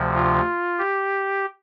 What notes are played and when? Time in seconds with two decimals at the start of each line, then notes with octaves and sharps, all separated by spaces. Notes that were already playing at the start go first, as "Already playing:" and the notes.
Already playing: D2 C3 F3
0.15 F4
0.78 G4